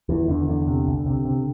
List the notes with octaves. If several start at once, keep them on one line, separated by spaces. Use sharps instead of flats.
E2 E3
E2 D3
E2 D3
C3
C2
C3
C3